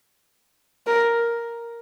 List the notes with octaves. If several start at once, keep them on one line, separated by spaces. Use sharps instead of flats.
A#4